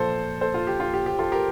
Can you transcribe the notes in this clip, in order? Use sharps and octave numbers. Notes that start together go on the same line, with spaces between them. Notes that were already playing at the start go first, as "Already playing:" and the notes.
Already playing: A#2 F3 A4 C5
A4 C5
F4
G4
F4
G4
G4
F4 A4
G4 A#4